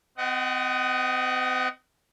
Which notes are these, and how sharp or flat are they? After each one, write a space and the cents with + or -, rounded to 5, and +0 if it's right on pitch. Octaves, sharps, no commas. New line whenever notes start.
C4 -35 D#5 +0 F#5 +20